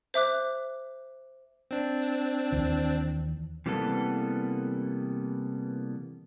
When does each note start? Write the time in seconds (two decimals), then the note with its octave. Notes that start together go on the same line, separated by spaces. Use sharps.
0.14 C5 E5 D6 F#6
1.71 C4 D4
2.52 D#2 E3
3.66 C3 E3 G3 A#3 B3 A4